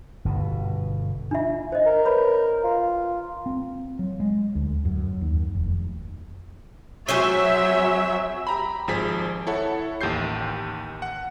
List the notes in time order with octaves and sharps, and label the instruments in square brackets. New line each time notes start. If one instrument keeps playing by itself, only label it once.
[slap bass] G1 B2
[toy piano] D4 F4 E5
C5 D#5
[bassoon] A#4
[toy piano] B4 C#5 B5
[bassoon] F4
[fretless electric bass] C4
F#3
G#3
D2
F#2
D#2
F1
[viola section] F#3 C4 E5 [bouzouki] G#4 C5 C#5
[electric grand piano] G4 A#5 B5
G#1 F3 G#4 B6
E4 A4 C#5 F#5
A1 D#2 G4 G6 C7
F#5